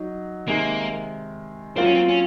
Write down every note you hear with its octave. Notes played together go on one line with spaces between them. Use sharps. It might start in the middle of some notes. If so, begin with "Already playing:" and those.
Already playing: F#3 D#4
C3 D#3 G#3 A#3
F#3 A#3 C4 F4
C#4
C4
C#4